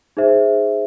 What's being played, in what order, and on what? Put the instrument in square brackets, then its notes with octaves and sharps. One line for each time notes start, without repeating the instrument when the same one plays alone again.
[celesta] D#4 G#4 C5 E5